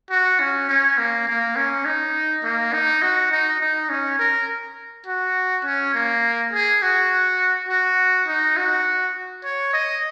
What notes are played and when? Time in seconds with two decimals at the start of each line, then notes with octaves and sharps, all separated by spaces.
0.10 F#4
0.40 C#4
0.69 C#4
0.98 A#3
1.27 A#3
1.56 C#4
1.85 D#4
2.44 A#3
2.73 D#4
3.02 F#4
3.31 D#4
3.60 D#4
3.89 C#4
4.19 A#4
5.06 F#4
5.64 C#4
5.94 A#3
6.53 G#4
6.82 F#4
7.69 F#4
8.27 D#4
8.57 F#4
9.44 C#5
9.73 D#5